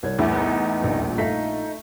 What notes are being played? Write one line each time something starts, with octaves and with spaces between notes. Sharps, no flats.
C2 C#5 G#6
E2 A2 E4
B3 D#4
D#1 A#1 F3
A#1 A3 D#4 F5 B6